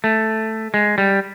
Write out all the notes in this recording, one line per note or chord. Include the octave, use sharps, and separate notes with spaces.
A3
G#3
G3